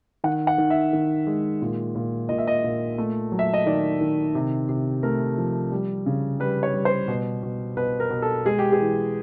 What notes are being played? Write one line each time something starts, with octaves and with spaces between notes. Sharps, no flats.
D#3 F#5
F#5
D#3
E5
D#3
G#3
A#2
A#2
A#2 D#5
E5
D#5
A#2
A3
F#3
E5
D#5
D#3 D5
D#3
C3
C3
A3 A#4
F3
G3
C#3
G3 B4
C#5
G3
C5
B2
B2
B2 B4
A#4
B2
A4
G#3 G#4
G4
G#4
E3